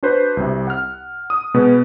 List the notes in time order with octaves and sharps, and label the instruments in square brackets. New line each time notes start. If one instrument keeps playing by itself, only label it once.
[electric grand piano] D4 F#4 B4 C5
C2 C3
F#5 F6
D#6
B2 G#3 B3